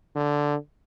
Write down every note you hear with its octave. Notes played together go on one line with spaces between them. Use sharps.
D3